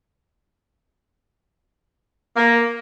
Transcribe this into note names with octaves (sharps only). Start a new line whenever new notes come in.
A#3